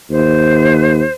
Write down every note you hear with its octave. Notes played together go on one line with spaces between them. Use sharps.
D#2 C5